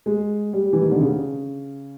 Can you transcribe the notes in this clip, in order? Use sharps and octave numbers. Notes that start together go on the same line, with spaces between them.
G#3
G3
E3
D#3
D3
C#3